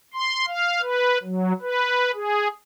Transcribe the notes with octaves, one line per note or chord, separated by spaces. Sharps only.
C6
F5
B4
F#3
B4
G#4